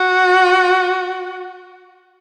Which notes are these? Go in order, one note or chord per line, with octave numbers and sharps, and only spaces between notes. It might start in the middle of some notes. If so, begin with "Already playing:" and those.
Already playing: F#4